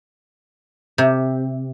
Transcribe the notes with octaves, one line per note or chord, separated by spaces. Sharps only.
C3